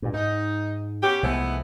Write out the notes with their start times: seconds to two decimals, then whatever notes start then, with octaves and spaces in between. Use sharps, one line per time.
0.02 G2 A#2
0.14 G#2 D#4
1.02 B3 C#4 G4
1.23 C2 E3 F3 G#3 A3 B3